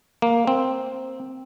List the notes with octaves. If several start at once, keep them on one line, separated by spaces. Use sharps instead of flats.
A#3
C4